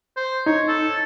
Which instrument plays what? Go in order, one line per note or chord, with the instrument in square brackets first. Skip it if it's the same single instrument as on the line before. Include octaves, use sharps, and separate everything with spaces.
[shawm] C5
[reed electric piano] D#4 [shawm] C#5
[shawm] A4